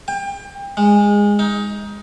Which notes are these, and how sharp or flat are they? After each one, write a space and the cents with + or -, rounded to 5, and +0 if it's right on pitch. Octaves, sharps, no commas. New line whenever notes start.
G5 +30
G#3 -20
D#4 +20